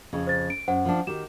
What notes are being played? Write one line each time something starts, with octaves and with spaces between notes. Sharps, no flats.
F2 C#3
C5 A6
D7
F#2 C5 F#5
F3 D4
D#3 F#4 G4 E7